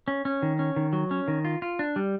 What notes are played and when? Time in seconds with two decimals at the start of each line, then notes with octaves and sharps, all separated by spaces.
0.08 C#4
0.25 C#4
0.42 D#3
0.59 C#4
0.76 D#3
0.93 F#3
1.11 C#4
1.28 D#3
1.45 F4
1.62 F4
1.79 D4
1.96 G3